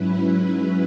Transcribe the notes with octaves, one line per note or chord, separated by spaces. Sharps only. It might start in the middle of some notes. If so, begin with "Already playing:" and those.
Already playing: G#2 F#3 C#4 E4 B4
B4